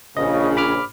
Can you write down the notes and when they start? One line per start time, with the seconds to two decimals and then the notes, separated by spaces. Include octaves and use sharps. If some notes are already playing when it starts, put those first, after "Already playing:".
0.17 A#1 C#3 D#5
0.57 B5 D6 F6